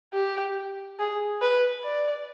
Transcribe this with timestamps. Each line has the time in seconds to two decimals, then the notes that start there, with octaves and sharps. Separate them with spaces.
0.14 G4
0.99 G#4
1.42 B4
1.84 D5